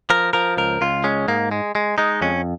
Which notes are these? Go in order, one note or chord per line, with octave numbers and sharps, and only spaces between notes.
F3 A#4
F3 A#4
C#2 A#4
C#2 F4
G#3 C#4
G#2 A#3
G#3
G#3
G#3 D#4
F2 C#4